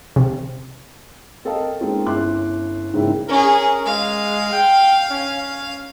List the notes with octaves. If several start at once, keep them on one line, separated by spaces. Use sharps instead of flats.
C3
C4 A4 A#4 D#5 F5 A5
G#3 A#3 C4 C#4 D#4 F4
G1 C#4 E4 C6 D6 F#6
G#2 C#3 A#3 C4 E4
C#4 G#4 A#4
G#3 F5
G5
C#4